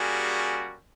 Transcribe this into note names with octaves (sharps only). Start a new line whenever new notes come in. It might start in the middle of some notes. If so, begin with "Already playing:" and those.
Already playing: G3 A#3 C#4 F#4 G#4